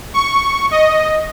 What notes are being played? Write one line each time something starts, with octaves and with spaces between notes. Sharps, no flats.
C#6
D#5